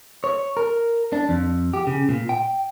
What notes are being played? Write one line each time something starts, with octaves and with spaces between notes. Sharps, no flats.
C#5
A#4
D4
F2
G4
C#3
A#2
G5